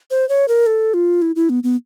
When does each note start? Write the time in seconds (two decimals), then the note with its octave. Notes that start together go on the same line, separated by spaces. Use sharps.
0.11 C5
0.29 C#5
0.48 A#4
0.66 A4
0.94 F4
1.22 E4
1.36 E4
1.50 B3
1.64 B3